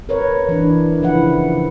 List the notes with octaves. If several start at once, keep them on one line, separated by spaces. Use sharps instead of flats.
A#4 B4 C#5
E3 D4
C#3 F3 E4 B4 F#5